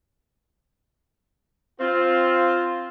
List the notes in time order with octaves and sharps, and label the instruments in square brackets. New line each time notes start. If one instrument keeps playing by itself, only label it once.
[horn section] C4 F4